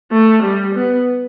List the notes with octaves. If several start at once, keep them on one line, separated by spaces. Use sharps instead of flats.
A3
G3
B3